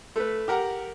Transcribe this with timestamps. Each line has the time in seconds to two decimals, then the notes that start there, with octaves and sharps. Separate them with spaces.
0.16 A3 B4
0.48 G4 A#4 F#5 A#5